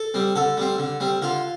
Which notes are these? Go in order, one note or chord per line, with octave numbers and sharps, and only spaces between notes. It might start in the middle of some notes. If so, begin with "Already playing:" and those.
Already playing: A4
G3 C4
D3 A4
G3 C4
D3
G3 C4
D3 F4